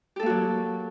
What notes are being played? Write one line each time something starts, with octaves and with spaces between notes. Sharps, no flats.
F#3 A#3 F#4 G4 A4